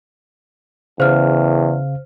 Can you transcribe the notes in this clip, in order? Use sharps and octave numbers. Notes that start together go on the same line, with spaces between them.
E2 C#3 C5 F5 F6